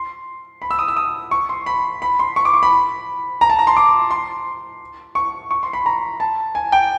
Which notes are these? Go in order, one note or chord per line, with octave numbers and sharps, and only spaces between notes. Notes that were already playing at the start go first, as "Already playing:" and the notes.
Already playing: C6
B5
E6
D#6
E6
D#6
C#6
C6
B5
B5
C6
C#6
D6
C#6
B5
A#5
A5
A#5
C6
D6
C6
C#6
C#6
C6
B5
A#5
A5
G#5
G5